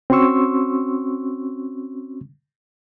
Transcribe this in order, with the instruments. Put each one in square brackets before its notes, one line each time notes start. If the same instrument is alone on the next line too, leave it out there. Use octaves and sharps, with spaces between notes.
[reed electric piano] C4 C#4 F#4 C6 C#6 E6